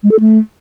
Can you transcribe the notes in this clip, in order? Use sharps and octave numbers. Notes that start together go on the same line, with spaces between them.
G#3
A4
A3